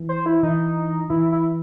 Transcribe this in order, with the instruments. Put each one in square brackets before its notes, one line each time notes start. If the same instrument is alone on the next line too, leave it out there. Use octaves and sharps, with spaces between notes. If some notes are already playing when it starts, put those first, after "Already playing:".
Already playing: [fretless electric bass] E3
[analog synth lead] C5
E4
[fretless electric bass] E3 [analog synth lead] D#4
[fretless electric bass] E3 [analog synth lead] E4
[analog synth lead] E4